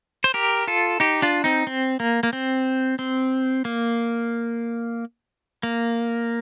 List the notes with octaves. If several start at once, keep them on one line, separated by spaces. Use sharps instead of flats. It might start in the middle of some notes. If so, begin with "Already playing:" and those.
C5
G4 A#4
F4 A4
D#4 G4
D4 F4
C4 D#4
C4
A#3
A#3
C4
C4
A#3
A#3